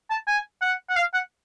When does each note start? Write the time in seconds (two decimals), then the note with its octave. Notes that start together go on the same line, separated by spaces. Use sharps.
0.10 A5
0.27 G#5
0.61 F#5
0.90 F#5
0.96 F5
1.14 F#5